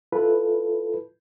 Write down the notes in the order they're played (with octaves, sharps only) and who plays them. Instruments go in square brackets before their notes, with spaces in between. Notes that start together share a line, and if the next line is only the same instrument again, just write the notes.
[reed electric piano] E4 F4 A4 B4